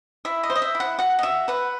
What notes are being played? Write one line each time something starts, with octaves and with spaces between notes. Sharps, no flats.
E4 E5
D#5
C5
D#5
E5
E4
F#5
F#4 F#5
D#5
F#4 E5
B4 F#5